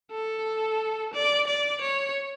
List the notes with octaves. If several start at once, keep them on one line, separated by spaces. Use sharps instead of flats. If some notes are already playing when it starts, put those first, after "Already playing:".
A4
D5
D5
C#5